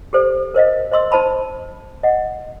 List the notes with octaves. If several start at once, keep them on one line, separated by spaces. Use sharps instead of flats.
G4 A4 C5 D5
A#4 C5 D#5 F5
C5 D#5 C6 E6
D#4 C5 A5 B5 C6
D#5 F#5